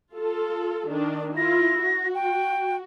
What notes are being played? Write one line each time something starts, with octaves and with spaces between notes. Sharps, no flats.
F4 A4
D#3 D4
E4 F4 A#6
F#4
G5